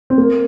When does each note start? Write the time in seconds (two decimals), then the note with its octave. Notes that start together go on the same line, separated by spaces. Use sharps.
0.10 C4
0.18 A#3